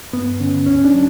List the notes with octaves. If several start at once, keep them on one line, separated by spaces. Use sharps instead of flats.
G2 B3
D3 C#4
C#2 C#4
D4
F#3